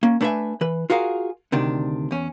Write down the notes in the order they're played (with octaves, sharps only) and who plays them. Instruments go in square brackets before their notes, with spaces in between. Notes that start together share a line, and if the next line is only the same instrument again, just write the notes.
[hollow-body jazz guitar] A#3 C#4
A3 D4 B4 C#5 E5 G#5
E3 B4
F4 F#4 G#4 A#4 F5
D2 C3 D#3 D4
E2 C#4